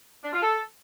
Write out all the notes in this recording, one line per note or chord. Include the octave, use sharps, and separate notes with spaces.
D4
F4
A4